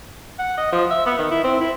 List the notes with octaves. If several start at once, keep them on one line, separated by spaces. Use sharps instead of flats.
F#5
D#5
F3
E5
B3
D#3
E4
C4
E4